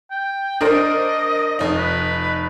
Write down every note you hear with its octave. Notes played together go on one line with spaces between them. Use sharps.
G5
D4 A#4 C5 D#5
F1 D#4
B4